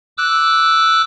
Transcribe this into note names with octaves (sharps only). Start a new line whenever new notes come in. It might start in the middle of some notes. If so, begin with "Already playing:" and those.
D6 E6 F#6